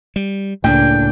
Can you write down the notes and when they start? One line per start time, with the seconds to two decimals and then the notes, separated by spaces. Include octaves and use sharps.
0.16 G3
0.64 C#2 A2 A#3 D4 G5